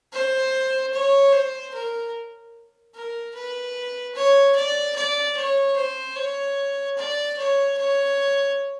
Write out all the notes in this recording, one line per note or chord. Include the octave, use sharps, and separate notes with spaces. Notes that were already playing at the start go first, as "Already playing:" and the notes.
C5
C#5
C5
A#4
A#4
B4
C#5
D5
D5
C#5
C5
C#5
D5
C#5
C#5